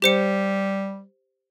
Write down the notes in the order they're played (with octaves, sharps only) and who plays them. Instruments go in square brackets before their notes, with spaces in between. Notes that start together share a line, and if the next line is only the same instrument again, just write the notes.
[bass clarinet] G3 [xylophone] G4 C5 C#7